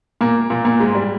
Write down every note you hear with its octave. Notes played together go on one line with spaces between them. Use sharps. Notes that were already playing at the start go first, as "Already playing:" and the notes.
A#2 A#3
A#2 A#3
A#2 A#3
G#2 G#3
G3